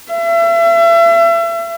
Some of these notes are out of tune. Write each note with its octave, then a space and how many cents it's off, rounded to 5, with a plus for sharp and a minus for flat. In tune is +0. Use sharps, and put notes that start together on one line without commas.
E5 +35